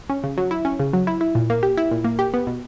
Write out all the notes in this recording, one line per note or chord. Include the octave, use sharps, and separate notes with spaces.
C#4
C#3
F#3
E4
C#4
C#3
F#3
E4
E4
A#2
A#3
G4
E4
A#2
A#3
G4
B3
B2